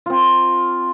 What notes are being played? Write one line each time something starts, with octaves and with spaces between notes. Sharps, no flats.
C4 F4